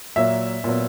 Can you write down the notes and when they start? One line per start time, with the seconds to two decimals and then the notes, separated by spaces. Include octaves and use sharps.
0.16 A#2 F#3 A#3 E5
0.64 A#2 F#3 B3